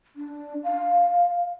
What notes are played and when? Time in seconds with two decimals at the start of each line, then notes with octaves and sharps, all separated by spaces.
0.16 D4
0.64 F5